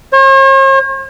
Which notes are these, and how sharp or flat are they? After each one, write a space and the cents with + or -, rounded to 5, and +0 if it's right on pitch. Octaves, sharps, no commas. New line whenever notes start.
C#5 -45